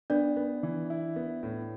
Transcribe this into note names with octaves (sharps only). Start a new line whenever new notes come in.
B3 D4 D5
B3
E3
E4
B3
A2